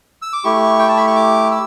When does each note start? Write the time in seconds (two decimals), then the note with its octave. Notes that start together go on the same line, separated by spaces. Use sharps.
0.22 E6
0.33 D6
0.44 A3 E4 G4 C#6
0.79 G5
0.89 A5
0.97 B5
1.07 C#6
1.16 D6
1.51 E6